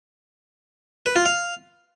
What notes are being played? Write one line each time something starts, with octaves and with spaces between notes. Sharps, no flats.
B4
F4
F5